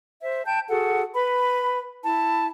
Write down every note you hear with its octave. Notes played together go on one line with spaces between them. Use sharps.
C5 E5
G5 A5 G6
F#4 G#4 A4 F#5
B4 B5
E4 A5